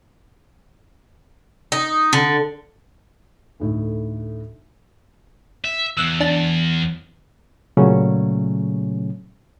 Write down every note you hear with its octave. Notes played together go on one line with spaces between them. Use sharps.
D#4
D3
D2 A2 D#4
E5
E2 E6 F#6
D4 A5
A#2 C#3 F#3 A3 C#4